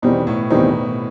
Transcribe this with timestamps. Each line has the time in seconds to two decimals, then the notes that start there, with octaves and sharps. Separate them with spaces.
0.02 E2 B2 D#3 G3 C4 D#4
0.27 A2
0.50 E2 B2 D#3 G3 C4 D#4